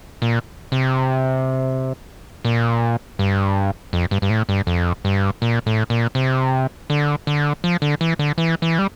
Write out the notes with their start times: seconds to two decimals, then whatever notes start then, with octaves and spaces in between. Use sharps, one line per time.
0.22 A#2
0.72 C3
2.45 A#2
3.19 G2
3.93 F2
4.11 G2
4.22 G2
4.30 A2
4.49 G2
4.67 F2
5.05 G2
5.42 A#2
5.66 A2
5.90 A#2
6.15 C3
6.90 D3
7.27 D3
7.64 F3
7.82 D3
8.01 E3
8.19 D3
8.38 E3
8.62 E3
8.79 G3